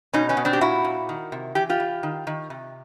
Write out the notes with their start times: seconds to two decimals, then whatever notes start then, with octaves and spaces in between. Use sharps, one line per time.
0.13 B2 C#4 D#4
0.29 B3 C#4
0.37 B2
0.45 C4 D4
0.53 G4
0.61 A#2 E4 F#4
0.84 A#2
1.09 D#3
1.32 C3
1.55 E3 G4
1.70 F4 G4
1.80 E3
2.03 D#3
2.27 D#3
2.50 C3